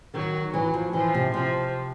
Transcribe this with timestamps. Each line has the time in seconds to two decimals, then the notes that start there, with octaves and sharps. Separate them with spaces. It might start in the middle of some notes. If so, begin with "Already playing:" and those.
0.14 D#3 F#3
0.53 E3 F#3
0.74 F3
0.93 E3 F3
1.14 C3
1.34 C3 F3